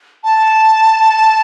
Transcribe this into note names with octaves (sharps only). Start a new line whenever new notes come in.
A5